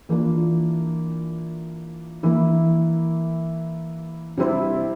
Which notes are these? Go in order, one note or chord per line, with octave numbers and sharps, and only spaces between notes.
E3 A#3 D4 F4
E3 A#3 E4
C3 G3 C4 E4